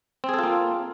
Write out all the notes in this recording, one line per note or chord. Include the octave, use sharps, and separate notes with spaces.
A#3 C4 F4 G#4 A4